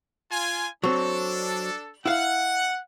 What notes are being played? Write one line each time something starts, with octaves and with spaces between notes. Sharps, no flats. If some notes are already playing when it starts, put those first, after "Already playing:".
F4 G#5
F#3 C4 D4 A4
E4 F5 F#5